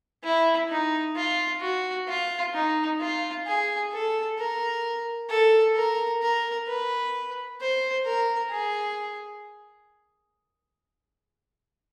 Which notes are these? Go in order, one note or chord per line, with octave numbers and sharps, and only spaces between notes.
E4
D#4
F4
F#4
F4
D#4
F4
G#4
A4
A#4
A4
A#4
A#4
B4
C5
A#4
G#4